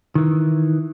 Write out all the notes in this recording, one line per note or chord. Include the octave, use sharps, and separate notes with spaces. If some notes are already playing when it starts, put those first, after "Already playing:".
D#3 E3